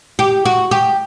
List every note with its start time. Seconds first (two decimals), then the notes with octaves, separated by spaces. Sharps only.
0.19 G4
0.45 F#4
0.71 G4